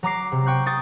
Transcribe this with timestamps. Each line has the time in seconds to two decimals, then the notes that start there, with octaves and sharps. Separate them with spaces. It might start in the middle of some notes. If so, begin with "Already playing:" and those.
0.03 F#3 A#5 D6 C7
0.32 C3
0.46 G5 C#6 F#6 G6
0.66 C#6 D#6 G6 A6